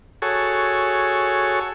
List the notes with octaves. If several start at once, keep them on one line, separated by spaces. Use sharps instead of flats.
F#4 G#4 A4 C#5